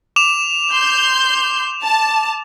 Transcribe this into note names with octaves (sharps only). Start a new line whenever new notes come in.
D6 E7 F7
C6 G6
A5